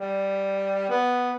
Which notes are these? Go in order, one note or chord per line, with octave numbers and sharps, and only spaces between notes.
G3
B3